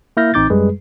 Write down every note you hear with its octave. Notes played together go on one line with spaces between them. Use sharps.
A#3 E4 E5 F6 G6 A#6
A1 C4 D#4 D6 G6 A6
F#2 G3 G#3 G#4 B4